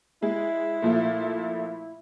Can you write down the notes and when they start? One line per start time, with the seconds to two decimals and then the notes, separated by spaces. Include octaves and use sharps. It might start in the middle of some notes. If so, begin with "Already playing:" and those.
0.22 G#3 E4
0.82 A#2 F3 A3